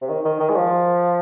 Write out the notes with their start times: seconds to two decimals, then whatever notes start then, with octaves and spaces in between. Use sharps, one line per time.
0.02 C3
0.09 D#3
0.25 D#3
0.40 D#3
0.50 G#3
0.55 F3